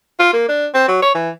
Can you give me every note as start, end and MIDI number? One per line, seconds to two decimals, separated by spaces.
0.19 0.29 65
0.33 0.46 58
0.49 0.67 62
0.74 0.87 60
0.88 0.98 54
1.02 1.13 73
1.15 1.30 52